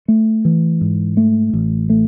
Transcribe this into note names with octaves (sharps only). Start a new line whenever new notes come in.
A3
E3
G#2
A3
A1
A3